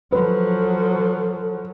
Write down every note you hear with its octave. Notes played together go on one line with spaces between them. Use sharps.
F3 F#3 A4 B4